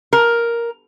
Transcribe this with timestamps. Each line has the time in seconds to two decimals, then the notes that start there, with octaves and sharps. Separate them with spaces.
0.13 A#4